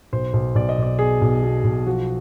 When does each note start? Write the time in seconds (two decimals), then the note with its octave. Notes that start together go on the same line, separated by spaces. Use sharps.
0.13 B1 C5
0.33 B1
0.55 B1 D5
0.69 D#5
0.78 B1 D5
0.99 B2 G#4
1.21 B1
1.42 B2
1.64 B1
1.86 F3 F#4